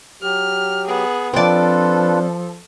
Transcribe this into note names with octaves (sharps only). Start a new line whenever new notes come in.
F#3 G4 F6
B3 G#4
F3 C4 D4 F4 A4 B4 D5